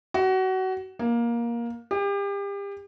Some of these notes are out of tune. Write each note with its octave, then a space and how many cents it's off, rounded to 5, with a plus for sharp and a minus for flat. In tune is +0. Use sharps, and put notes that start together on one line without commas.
F#4 +25
A#3 +15
G4 +35